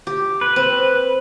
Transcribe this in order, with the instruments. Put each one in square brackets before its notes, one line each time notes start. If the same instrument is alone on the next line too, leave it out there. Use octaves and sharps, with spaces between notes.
[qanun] G4
[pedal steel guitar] B4
[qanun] C4